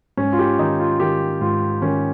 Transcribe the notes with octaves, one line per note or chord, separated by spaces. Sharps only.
G#2 C#4
F4
G4
D#3 D#4
F4
D#3 G4
G#2 F4
D#3 C#4